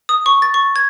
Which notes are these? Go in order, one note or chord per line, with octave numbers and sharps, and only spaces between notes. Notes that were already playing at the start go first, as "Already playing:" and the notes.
D#6
C#6
A6
C#6
G#6